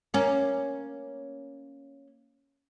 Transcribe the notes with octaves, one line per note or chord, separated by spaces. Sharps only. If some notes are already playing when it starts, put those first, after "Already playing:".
A#3 C#4